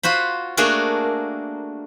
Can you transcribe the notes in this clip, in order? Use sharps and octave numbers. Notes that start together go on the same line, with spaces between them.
F4 F#4 C5 B5
A3 A#3 D4 F#4 G#4 A#4